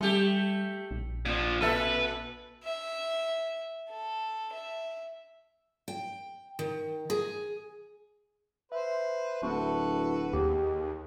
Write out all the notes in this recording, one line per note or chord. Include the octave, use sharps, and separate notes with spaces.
G3 A3 G4
A#1
A#2 F3 D4
A#2 A4 B4 E5
E5
A4
E5
G5
D#3
G#4
B4 C5 E5
D1 E4 F#4 A4 B4 C#6
D#2 G4 G#4